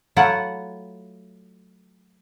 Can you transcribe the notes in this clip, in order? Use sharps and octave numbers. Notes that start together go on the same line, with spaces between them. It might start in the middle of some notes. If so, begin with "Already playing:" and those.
F#3 A3 E4 F4 F#5